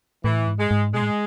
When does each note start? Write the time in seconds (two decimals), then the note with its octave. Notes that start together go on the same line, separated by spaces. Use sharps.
0.24 A2 E3
0.48 G#2
0.59 G#3
0.71 G#2
0.94 B2 G#3
1.02 A2